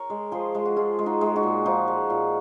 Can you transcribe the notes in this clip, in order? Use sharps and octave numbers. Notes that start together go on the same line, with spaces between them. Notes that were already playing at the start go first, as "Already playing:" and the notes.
Already playing: A#4 C#5
G#3
F3 G#4 C5
G#3
F#4
G#3 F4 G#4
G#3
D#4 F#4
G#3
D#4 F#4
A#2
F3 D#4 F#4
G#3
A#2